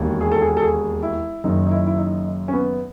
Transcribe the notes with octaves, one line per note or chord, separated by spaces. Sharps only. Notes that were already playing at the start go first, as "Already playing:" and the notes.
Already playing: E1 D#2 D#3
G#4
A4
G#4
A4
G#4
E4
F#1 F#2 D#3 D#4
D#4
E4
E4
D#4
C#4
B3